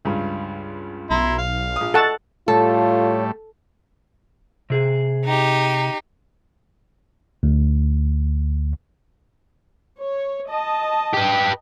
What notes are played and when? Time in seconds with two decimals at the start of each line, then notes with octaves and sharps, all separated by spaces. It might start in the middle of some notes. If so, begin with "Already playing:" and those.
0.05 C#2 G2
1.10 B1 E4 A#5 C6
1.38 F5
1.76 A#1 D#6
1.94 A4 D#5 F#5 A5 C#6
2.48 A2 G3 A3 F4 A4 C#5
4.70 C3 G#4
5.24 D#4 G4
7.43 D2
9.97 C#5
10.49 D#5 A5
11.14 G4 B4